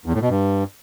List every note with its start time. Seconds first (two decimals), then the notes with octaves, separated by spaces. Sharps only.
0.06 E2
0.14 A2
0.22 B2
0.30 G2